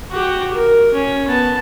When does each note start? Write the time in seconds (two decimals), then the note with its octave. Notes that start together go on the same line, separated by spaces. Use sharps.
0.10 F#4 G4
0.52 A#4
0.93 C#4
1.28 B3 A5